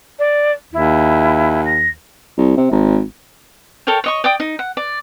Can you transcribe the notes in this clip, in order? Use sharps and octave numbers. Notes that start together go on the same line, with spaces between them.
D5
D#2 E4
A#6
C2
C3
G#1
A4 A#4 C#5 G5
C#5 D#5 C#6
D5 G5 D#6
D#4
F#5
D5